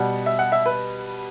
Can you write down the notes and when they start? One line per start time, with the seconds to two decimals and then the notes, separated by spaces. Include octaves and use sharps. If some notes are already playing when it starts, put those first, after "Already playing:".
Already playing: B2 G3 F#5
0.26 E5
0.39 F#5
0.52 E5
0.66 B4